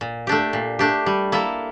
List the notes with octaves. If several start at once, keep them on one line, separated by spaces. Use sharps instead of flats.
A#2
A3 D4 G4
A#2
A3 D4 G4
G3
A#3 E4 A4